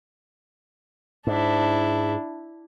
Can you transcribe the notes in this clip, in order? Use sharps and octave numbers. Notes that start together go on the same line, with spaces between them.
G#2 D4 E4